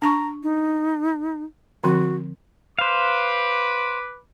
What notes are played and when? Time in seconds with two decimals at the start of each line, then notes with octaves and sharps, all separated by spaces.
0.02 D4 A5 A#5 C#6
0.43 D#4
1.84 D3 F3 C4 F#4
2.79 B4 C5 F5 D6